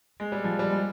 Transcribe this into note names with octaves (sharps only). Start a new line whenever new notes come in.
G#3
G3
F3
G3
G#3